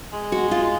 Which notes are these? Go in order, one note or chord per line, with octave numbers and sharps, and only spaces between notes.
G#3
F#4
F4